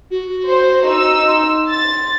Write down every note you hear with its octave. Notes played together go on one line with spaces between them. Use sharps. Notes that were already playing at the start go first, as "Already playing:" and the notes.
F#4
C5
D#4 E6
C6
A6